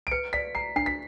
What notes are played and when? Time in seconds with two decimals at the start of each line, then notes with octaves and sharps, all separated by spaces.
0.07 D7
0.11 B4 C#7
0.33 D5 B6
0.55 A#5 C7
0.76 D4 C7
0.86 B6